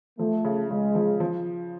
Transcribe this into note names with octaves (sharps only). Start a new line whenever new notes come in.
F3 A3
C#3
C#3 G#3
F3
F3